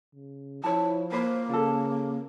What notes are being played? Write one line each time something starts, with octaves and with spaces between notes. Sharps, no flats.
C#3
F3 E4 C#5 A5
A#3 B4 C5
C#3 F4 A4